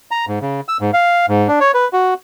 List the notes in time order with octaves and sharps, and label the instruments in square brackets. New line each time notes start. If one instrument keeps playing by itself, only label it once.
[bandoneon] A#5
G#2
C#3
E6
G#2
F5
G#2
D4
C#5
B4
F#4